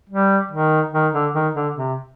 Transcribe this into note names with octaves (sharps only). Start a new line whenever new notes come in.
G3
D#3
D#3
D3
D#3
D3
C3